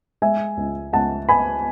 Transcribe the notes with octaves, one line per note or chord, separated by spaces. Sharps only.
G#3 E5 G#5
C#2
C#2 F#5 A5
B3 G#5 B5